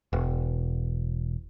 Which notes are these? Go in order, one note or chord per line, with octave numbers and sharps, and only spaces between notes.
E1